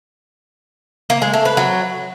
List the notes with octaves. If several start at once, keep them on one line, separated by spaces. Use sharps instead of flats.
A#3
G#3
A3
B4
F#3